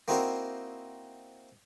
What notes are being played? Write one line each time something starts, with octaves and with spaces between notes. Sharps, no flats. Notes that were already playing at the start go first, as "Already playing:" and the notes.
A#3 C4 D#4 E4 F#4 A#4